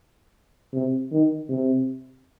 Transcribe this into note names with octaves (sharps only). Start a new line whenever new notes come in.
C3
D#3
C3